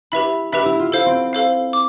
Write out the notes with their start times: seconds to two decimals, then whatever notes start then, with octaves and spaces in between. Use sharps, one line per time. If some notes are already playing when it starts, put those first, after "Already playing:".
0.12 E4 G4 B4 E5 B5
0.52 E4 G4 B4 E5 B5
0.66 E4
0.80 F4
0.92 E4 A4 C5 F5
1.06 C4
1.33 A4 C5 F5
1.73 D6